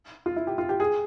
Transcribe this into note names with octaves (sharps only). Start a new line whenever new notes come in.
F4
E4
G4
F4
G4
G#4